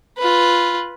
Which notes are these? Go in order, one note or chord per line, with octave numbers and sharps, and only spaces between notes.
F4 B4